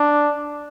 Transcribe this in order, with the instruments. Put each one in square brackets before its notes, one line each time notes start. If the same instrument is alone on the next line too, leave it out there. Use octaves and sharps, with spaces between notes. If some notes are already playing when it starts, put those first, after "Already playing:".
Already playing: [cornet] D4